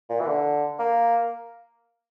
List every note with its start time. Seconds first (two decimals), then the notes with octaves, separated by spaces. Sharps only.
0.09 A#2
0.20 E3
0.27 D3
0.79 A#3